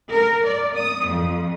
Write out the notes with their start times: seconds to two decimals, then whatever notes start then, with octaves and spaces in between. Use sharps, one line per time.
0.12 A#4
0.46 D5
0.76 D#6
1.07 F2